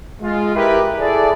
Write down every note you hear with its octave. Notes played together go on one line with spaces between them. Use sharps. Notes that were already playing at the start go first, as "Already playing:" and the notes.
G#3 F4
E4 G4 A#4 B4
E4 G#4 A4 D5